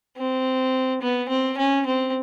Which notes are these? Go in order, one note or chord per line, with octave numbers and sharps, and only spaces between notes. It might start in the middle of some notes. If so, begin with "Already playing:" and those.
C4
B3
C4
C#4
C4